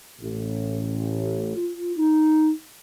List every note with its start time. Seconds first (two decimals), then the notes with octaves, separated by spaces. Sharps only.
0.20 A1
1.56 F4
1.97 D#4